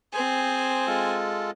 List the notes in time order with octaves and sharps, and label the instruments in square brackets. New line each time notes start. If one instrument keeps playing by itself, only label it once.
[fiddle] C4 G#5 [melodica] G#4 C5
[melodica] G#3 F4 A4